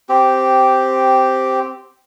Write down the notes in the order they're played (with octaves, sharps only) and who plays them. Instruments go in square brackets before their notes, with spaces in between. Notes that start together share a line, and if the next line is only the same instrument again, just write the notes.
[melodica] C4 G4